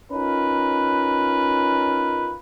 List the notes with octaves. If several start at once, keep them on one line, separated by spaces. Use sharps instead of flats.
C#4 D#4 F4 A#4 B4